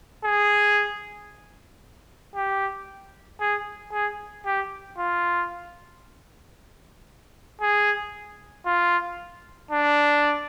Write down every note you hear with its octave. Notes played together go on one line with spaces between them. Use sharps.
G#4
G4
G#4
G#4
G4
F4
G#4
F4
D4